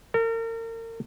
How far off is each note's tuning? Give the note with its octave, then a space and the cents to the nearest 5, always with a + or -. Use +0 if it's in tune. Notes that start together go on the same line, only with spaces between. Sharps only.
A#4 -40